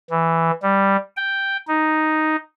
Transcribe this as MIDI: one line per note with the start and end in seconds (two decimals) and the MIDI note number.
0.10 0.51 52
0.63 0.96 55
1.17 1.57 79
1.68 2.36 63